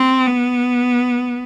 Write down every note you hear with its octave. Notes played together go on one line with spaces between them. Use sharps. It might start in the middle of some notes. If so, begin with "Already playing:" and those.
Already playing: C4
B3